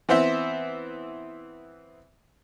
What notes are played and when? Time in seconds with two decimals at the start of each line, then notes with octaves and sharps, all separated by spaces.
0.09 E3 B3 C4 C5 E5